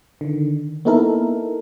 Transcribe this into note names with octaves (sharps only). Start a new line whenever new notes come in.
D3 D#3
A#3 B3 D#4 E4 A4 A#4